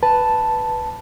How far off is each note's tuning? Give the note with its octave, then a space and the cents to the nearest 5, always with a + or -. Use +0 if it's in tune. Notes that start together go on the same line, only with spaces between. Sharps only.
B4 +0 A5 +0